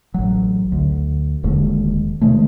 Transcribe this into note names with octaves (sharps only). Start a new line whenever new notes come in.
A1 F#3
D2
D1 D#2 D3 G#3
C3 D#3 G#3 A3